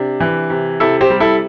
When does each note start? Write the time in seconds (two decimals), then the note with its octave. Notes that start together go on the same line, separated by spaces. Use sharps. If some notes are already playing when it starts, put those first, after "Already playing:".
Already playing: C3 D4
0.20 E3
0.50 C3
0.80 C3 E4 A4
1.01 G4 C5
1.10 G3
1.20 E4 A4